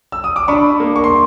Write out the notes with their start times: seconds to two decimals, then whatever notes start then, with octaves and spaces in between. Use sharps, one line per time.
0.12 E6
0.24 D#6
0.36 D6
0.48 D4 B5 C#6
0.80 A#3
0.96 C#6
1.04 C6